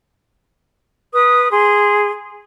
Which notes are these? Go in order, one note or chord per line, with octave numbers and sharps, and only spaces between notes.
B4 D#6
G#4 C6